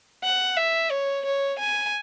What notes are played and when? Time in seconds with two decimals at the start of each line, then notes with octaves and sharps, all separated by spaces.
0.24 F#5
0.57 E5
0.91 C#5
1.25 C#5
1.59 G#5